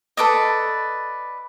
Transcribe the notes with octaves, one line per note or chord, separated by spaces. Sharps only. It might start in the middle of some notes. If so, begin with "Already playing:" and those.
A4 B4 D5 D#5